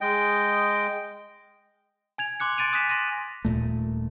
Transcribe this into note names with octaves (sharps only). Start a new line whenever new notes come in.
G#3 D#5 G5
G#5 G#6 F7
C6 D6 F#6 C#7
G#5 C6 A6 D7 D#7 F7
D#6 F#6 B6 E7
C6 A#6 D#7
D#1 F#2 A#2 A3